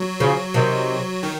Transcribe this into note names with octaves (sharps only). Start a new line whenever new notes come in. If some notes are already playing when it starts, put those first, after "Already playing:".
Already playing: F#3
C#3 F3
C3 D#3
D#3